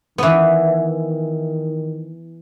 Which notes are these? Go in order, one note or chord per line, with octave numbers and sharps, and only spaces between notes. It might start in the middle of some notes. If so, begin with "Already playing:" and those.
D#3 E3 B3